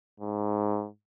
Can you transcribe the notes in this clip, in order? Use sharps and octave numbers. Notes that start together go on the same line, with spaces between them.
G#2